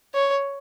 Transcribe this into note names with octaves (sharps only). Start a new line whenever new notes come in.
C#5